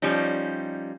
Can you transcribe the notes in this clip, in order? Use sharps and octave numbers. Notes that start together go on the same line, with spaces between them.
F3 G3 C#4 D#4